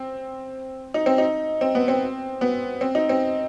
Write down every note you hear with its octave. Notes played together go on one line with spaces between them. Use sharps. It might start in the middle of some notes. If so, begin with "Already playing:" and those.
Already playing: C4
D#4
C4
D#4
C4
B3
C4
B3
C4
D#4
C4